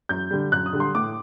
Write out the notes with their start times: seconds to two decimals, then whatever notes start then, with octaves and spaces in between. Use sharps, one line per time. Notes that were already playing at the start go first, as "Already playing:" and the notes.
0.09 F#2 G6
0.31 D3 G3
0.52 F#2 F#6
0.66 D#6
0.73 D3 G3
0.80 C6
0.95 A2 D6